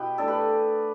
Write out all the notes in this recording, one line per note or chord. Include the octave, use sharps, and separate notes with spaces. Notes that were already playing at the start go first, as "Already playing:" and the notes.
Already playing: B2 B3 E4 G4 B4 G5
E3 A3 D4 A4 D5
G4 B4